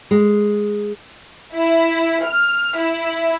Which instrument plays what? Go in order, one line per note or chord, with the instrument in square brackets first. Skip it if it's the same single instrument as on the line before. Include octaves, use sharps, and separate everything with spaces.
[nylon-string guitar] G#3
[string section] E4
F6
E4